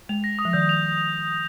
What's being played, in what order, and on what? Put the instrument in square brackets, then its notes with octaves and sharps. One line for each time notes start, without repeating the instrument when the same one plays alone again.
[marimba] G#3 [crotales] F7
[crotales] A#6
D#6
[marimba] F3
[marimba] D#3 [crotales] G6
[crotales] F7